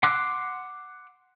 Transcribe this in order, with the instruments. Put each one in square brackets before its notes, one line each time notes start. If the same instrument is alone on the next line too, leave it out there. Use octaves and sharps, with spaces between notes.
[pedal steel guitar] F#5 C6 D6 E6 F#6